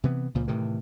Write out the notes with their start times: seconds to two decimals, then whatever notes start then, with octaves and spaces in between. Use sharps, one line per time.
0.04 C3 E3 B3
0.34 C#2 A#2 F3
0.48 A2 C3 D#3 E3